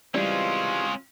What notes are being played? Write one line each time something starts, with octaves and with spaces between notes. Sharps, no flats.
E3 G3 G#3 C4 C#4 F4